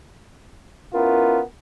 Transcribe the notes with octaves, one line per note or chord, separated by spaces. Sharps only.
B3 C#4 E4 F4 A#4